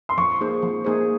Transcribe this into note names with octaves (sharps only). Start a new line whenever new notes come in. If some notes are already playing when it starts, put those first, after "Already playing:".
C6
F3 C#6
A#3 D#4 G#4 C5
F3
A#3 D#4 G#4 C5